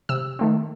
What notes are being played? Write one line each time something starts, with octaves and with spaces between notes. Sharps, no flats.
C3 E6
D#3 A3 C4